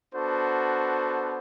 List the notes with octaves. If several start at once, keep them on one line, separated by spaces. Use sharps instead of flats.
B3 D4 F#4 A4 C5